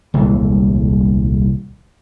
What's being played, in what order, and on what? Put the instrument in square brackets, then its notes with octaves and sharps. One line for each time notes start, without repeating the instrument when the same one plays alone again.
[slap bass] D#1 C2 E3 G#3